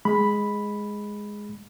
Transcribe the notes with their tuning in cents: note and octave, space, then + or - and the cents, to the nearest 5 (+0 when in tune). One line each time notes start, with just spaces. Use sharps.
G#3 +0 B5 +0